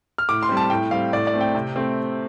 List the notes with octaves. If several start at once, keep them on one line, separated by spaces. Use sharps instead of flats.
F6
A2 D6
C6
G3 C4
A5
A2 G5
G3 C4 F5
A2 D5
D5
A3 C4
G5
C3
A3 C4